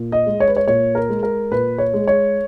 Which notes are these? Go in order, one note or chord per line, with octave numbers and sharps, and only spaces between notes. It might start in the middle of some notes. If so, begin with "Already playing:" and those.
Already playing: A#2
D#5
G#3
C#5
B4
C#5
A#2 C#5
A#4
G#3
A#4
A#2 B4
C#5
G#3
C#5